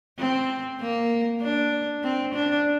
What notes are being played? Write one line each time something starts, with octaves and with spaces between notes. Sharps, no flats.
C4
A#3
D4
C4
D4